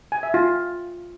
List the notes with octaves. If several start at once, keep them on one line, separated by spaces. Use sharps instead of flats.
G#5
E5
F4